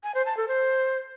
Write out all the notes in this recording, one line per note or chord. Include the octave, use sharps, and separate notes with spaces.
G#5
C5
A5
A4
C5